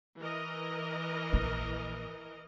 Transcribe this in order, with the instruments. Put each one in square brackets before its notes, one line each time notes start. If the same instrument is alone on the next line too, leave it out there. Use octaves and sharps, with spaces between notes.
[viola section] E3 A#4 D#5
[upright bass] A#1 A#2